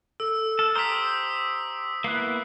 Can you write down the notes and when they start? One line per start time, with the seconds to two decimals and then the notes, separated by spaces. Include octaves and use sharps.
0.20 A4 E6
0.59 A4 F6
0.75 G4 C5 A#5 D#6 B6
2.04 A#3 B3 E4 F#6 C7